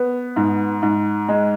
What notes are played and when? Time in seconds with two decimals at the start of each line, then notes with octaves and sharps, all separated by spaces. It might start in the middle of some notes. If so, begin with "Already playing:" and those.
Already playing: B3
0.36 G#2
0.82 G#2
1.28 G#3